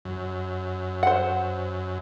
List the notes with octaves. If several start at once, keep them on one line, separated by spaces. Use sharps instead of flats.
F#2
C5 F#5